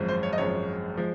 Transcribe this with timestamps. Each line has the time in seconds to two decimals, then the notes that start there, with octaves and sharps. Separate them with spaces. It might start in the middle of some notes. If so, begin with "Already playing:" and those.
Already playing: G#1 F#2 F3 G#3
0.08 C5
0.23 C#5
0.33 D#5
0.38 G#1 F#2 F3 G#3 C#5
0.97 F3 G#3